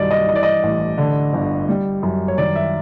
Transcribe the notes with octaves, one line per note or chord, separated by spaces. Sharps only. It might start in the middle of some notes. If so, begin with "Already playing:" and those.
Already playing: C2 G2 D#3 F#3 D5 D#5
D#5
E3 D#5
D5
D#5
A1
D3
G1
G3
F#2
C#5
D#3 D5
E5